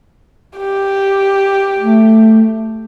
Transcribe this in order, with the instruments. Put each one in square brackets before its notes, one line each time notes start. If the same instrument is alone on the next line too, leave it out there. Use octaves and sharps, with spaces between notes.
[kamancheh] G4
[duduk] A3